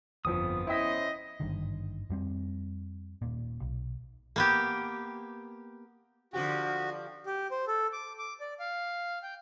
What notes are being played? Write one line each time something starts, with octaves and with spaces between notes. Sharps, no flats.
G1 F2 F3 B3 D#6
C#4 E4 C5 D#5 G5 B6
G#1 G2 D3 D#3
F2 G3 C4
D#1 A#2
B1
A#3 B3 G4
D3 F3 F#4 G4
G4
C5
A4
D6
D6
D5
F5
G5